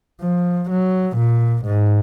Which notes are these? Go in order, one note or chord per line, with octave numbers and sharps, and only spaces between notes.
F3
F#3
A#2
G#2